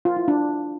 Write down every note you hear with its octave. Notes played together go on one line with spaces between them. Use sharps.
F4
E4
D4